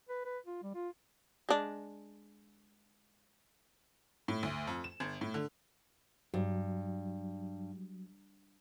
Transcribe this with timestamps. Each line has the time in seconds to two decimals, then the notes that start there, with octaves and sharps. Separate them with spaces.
0.09 B4
0.26 B4
0.46 F4
0.63 G3
0.75 F4
1.49 G#3 D4
4.28 A2
4.43 D2
4.67 F2
4.84 E7
5.00 G1
5.21 A2
5.34 D3
6.34 G2 F#3